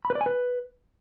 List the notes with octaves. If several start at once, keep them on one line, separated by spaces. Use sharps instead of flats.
B5
B4
D5
G#5
B4